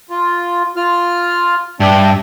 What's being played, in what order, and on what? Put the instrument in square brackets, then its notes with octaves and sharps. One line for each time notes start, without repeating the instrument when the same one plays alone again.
[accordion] F4
F4 F6
[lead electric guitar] G2 [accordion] D4 E5 G5